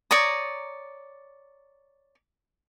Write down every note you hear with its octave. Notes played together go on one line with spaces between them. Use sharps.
C#5 D5 A#5 D#6